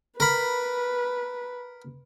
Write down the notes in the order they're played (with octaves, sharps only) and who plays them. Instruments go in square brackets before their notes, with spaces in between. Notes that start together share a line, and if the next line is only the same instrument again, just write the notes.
[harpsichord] A#4 B5 [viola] B4